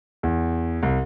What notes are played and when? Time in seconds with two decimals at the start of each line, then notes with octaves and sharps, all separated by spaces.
0.23 E2
0.83 C2